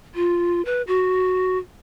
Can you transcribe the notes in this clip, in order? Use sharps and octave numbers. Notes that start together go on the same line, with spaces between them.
F4
B4
F#4